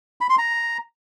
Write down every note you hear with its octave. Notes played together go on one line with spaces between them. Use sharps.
B5
C6
A#5